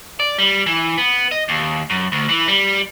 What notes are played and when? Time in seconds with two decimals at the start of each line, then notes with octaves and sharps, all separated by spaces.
0.20 D5
0.38 G3
0.66 E3
0.98 B3
1.32 D#5
1.49 D#2
1.90 F#2
2.12 D2
2.29 E3
2.48 G3